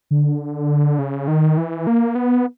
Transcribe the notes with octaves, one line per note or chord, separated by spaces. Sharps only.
D3
C#3
D#3
E3
A#3
B3